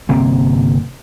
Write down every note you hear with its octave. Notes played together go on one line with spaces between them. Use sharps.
G1 C3 A#3 C4